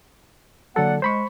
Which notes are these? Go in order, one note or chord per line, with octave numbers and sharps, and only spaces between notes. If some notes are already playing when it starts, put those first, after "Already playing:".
D3 F#3 A#3 A4 D5 F#5
G#3 C5 B5 C#6